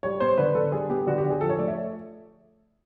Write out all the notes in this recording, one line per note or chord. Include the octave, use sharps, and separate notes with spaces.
G3 C#5
B3 C5
D3 B4
D3 A4
G3 G#4
B3 G4
D3 F#4
G4
D3
G#4
F3 A4
C#5
A3 D5
E5